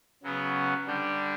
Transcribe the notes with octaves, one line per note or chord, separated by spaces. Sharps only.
C#3 F#3 B3 F#4
D3 G3 D4 G4